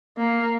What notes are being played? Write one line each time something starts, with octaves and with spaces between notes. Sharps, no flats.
A#3